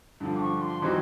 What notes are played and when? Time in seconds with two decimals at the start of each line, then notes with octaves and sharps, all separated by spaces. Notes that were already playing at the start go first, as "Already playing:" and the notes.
0.20 G2 D3 F3
0.36 D6
0.42 C#6
0.61 C6
0.82 E3 G3 C4 D#4 F#4 C6